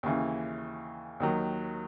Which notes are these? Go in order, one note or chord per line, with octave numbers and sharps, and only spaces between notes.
D#2 C#3 E3
D#2 D#3 F#3